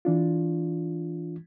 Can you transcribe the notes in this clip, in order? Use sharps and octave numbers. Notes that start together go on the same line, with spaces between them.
E3 D4 F4